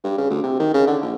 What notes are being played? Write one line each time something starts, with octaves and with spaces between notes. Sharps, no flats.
G2
C#3
D2
C3
D#3
C#3
D3
A#1